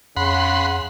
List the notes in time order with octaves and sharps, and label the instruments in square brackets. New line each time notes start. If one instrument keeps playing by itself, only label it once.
[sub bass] F2 [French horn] C#3 [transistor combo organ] F#5 B5 C6